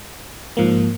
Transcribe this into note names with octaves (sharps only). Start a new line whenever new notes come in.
G#2 F3 A#3